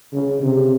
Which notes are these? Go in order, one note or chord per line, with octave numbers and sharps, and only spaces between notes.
C#3
C3